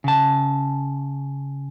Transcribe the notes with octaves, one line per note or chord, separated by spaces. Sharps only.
C#3 A5